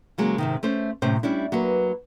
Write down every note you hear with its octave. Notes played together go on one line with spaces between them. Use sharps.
C#3 F#3 G#3 A#3
G#2 C3 D#3
A3 C#4 C5
F#2 A2 C3 C#4 C5
G3 C#4 D4 E4
F#3 A#3 F#4 B4